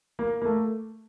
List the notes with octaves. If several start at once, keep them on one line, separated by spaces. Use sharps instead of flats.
A#3
A#3
A3